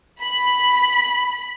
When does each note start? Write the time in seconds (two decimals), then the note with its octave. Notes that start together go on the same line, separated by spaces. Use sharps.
0.22 B5